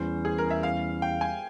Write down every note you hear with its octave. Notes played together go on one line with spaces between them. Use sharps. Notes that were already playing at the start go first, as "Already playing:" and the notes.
Already playing: E2 E3 G3 C#4 E4 C5
G#4
A#4
E5
F5
G5
G#5